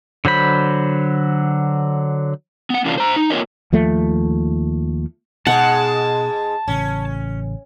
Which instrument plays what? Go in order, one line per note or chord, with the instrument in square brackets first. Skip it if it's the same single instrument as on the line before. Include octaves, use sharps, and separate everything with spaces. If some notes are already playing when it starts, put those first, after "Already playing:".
[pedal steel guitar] D3 F#3 C5 B5
[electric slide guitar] B3 F#5
C3 E3 A#3 C#4 D4 F4
C5 A#5
D#4
A#3 C4 F4 A#4 C#5 D#5
[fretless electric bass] D#2 F3 A3
[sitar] G#2 G#3 [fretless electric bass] B2 [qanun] F#5 [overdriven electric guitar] A5
[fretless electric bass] A1 C#3 [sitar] C#4